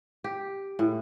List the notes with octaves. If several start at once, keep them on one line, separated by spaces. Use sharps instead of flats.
G4
A2